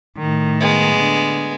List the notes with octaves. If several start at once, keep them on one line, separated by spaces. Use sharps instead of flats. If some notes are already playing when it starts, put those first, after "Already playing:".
A2 D#3
G#3 B3
D3